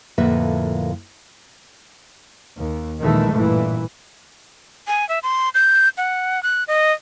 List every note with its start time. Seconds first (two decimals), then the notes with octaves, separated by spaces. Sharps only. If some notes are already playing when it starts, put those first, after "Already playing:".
0.18 F2 A2 D3 A#3 B4 E5
2.57 D#2
3.02 A#1 D#2 D#3 E3 G#3 A3
3.31 A1 G2 A#2 E3
4.87 G#5
5.09 E5
5.23 C6
5.55 G6
5.97 F#5
6.43 F#6
6.68 D#5